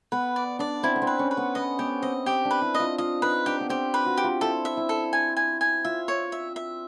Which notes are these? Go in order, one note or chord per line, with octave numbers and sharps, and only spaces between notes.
B3 B4
D5
D4 D5
C4 E4
B3
C4
B4
C#4
B4
B3
B3 D#5
B3 G4
C4 D#5
C4 G4
D4
B4
E4
D#5
F4
F4 D#5
D#4 B4
D4 G4
B3
C4 G4
B4
F#4
G4
F4
E4 A4
E5
E4
A4
G#5
G#5
G#5
F4 E5
C#5
E5
E5